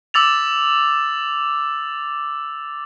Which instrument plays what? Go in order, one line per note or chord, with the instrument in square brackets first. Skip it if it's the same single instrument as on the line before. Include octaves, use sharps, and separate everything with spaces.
[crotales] D6 E6 A6 F7